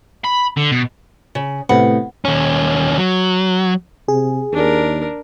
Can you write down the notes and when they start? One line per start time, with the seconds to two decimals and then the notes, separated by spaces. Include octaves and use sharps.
0.24 B5
0.57 D3
0.72 B2
1.35 C#3
1.69 A2 C3 B3 F#5
2.25 D#2 C#4
2.98 F#3
4.08 C3 G#4
4.52 D#2 D4 A#4